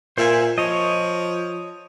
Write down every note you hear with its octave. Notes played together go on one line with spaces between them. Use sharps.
A#2 C5 E5 G#5
F3 C#5 D#5